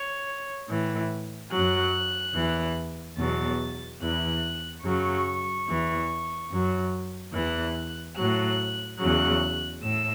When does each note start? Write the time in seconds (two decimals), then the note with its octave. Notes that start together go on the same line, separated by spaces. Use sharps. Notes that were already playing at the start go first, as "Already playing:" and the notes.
Already playing: C#5
0.70 A2 E3
1.52 F#2 F#3 F#6
2.35 E2 E3
3.18 E2 B2 F#3 A6
4.01 E2 E3 F#6
4.84 F#2 C#3 F#3 C#6
5.67 E2 E3
6.51 F#2 F#3
7.34 E2 E3 F#6
8.17 A2 F#3 F#6
9.00 E2 C#3 F#3 F#6
9.83 A2 E6